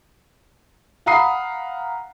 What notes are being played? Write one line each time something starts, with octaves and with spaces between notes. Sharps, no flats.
F5 F#5 A#5 B5 D#6 C7